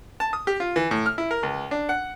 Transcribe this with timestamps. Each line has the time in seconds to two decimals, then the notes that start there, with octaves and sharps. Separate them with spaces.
0.20 A5
0.33 D#6
0.47 G4
0.60 F4
0.76 E3
0.91 A2
1.06 F6
1.18 E4
1.31 A#4
1.43 C#2
1.71 D4
1.89 F#5